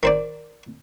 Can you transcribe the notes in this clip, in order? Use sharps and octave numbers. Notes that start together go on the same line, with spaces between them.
D#3 C5 D5